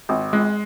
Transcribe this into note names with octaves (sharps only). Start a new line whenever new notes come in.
G#1
G#3